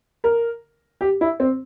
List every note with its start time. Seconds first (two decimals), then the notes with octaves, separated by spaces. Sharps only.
0.24 A#4
1.01 G4
1.21 E4
1.40 C4